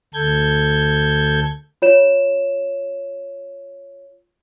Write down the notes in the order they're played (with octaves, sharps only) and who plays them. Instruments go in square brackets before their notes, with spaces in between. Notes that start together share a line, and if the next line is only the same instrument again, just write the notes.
[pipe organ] D2 A4 G6 G#6
[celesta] F4 C#5 E7